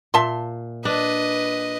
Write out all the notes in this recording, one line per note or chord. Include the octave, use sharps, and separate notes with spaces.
A#2 E5 A5 C6
D4 B4 D#5